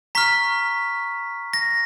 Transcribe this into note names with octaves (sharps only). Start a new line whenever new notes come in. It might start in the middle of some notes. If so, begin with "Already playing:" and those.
A#5 C#6 F6 B6
A#6